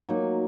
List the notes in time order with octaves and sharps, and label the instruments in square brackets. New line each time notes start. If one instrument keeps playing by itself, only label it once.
[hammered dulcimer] F#3 A#3 D#4